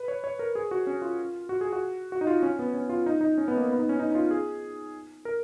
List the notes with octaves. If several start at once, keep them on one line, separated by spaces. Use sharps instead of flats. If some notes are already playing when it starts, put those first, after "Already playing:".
Already playing: B4
C#5
C#5
A#4
G#4
F#4
C#4
F4
F#4
G#4
F#4
F#4
D#4
F4
C#4
B3
C#4
F4
D#4
D#4
C#4
B3
A#3
B3
D#4
C#4
D#4
D#4
F4
G#4
A#4